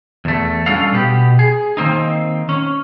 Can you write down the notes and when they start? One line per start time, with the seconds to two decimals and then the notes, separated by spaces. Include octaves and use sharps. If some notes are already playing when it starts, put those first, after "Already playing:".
0.25 E2 A3
0.66 G3 C#4 D4 F4 A4 F5
0.92 B2 B3 G4
1.39 G#4
1.77 D#3 A#3 C4 D#4
2.49 C#4